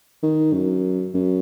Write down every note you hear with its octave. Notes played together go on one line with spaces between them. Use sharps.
D#3
F#2
F#2